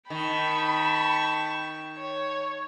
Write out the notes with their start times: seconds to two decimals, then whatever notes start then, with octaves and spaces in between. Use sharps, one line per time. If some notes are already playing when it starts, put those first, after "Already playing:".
0.10 D#3 G5 A5 B5 C#6
1.97 C#5